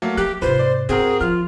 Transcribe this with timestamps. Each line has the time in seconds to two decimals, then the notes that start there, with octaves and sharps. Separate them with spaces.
0.02 F#3 A3 A#3
0.17 F#3 G4 F#6
0.42 G#2 C3 F4 B4 C5
0.59 D5
0.89 G2 C4 F#4 G#4 A#4
1.21 F3 F4 F6